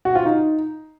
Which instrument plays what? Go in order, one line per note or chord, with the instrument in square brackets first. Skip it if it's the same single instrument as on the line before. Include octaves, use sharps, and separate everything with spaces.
[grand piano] F#4
F4
D#4